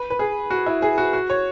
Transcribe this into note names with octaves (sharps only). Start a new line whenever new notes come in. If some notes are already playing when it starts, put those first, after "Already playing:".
Already playing: B4
B4
G#4
F#4
E4
G#4
F#4
F#4
C#5